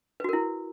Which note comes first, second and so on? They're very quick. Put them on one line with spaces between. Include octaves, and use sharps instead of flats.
B4 F#4 A#4 E4